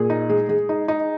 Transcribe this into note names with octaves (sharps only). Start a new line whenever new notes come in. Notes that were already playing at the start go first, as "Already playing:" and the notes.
Already playing: A#2 G#4
D#4
G#3
G#3
D#4
D#4